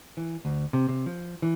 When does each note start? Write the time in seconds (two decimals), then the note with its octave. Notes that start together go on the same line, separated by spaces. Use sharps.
0.17 E3
0.45 D2
0.73 C3
0.89 C3
1.06 F3
1.42 E3